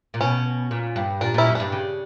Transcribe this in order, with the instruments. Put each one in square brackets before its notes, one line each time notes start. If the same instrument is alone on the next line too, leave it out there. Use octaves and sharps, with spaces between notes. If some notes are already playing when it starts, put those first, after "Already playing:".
[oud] A#2
[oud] B2 [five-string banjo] C#4
[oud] A#2
G2
[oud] A#2 [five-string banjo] D4
[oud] A#2 [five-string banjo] C#4 E4
[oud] F#2
[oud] G2 [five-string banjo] D4
[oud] C#3